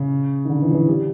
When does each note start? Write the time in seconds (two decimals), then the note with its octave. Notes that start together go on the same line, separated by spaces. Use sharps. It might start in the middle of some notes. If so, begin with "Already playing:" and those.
Already playing: C#3
0.45 D#3
0.49 D3
0.62 E3
0.70 F3
0.74 E3
0.88 G3